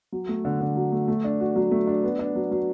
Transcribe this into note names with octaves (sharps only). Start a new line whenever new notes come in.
F#3
A3
D3
D3
F#3
A3
A3
D4
F#4
F#3
A3
D4
B3
D4
F#3
F#3